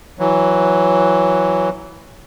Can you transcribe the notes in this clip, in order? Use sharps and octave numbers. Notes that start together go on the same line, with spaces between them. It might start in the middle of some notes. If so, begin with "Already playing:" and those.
E3 F#3